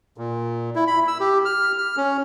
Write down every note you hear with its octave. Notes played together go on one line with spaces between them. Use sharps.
A#2
E4
B5
E6
G4
F6
F6
C#4